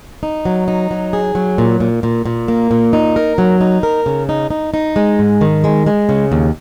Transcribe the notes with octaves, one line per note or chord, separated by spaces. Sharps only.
D#4
F#3
D#4
F#3
G#4
F#3
A#2
A#2
A#2
A#2
A#3
A#2
D#4
A#4
F#3
D#4
A#4
C#3
D#4
D#4
D#4
G#3
G#2
D#3
G#3
G#3
C#3
D#2